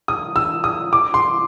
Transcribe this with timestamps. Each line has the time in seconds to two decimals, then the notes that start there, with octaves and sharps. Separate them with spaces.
0.08 D#6
0.36 E6
0.64 D#6
0.93 D6
1.14 C6